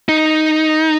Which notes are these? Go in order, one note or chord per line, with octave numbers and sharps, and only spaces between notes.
D#4